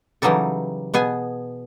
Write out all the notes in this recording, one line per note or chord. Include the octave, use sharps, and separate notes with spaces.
C#3 E3 F#3 G3 D#4 A4
B2 B3 G#4 G#5